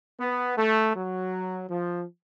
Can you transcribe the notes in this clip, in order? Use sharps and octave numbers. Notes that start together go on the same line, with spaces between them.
B3
A3
F#3
F3